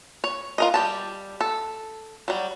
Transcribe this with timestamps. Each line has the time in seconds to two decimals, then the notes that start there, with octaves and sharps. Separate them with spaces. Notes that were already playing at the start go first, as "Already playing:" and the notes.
0.24 C#5
0.58 F4 A#4 D#5
0.74 G3 G4 A5
1.41 A4
2.28 F#3 G3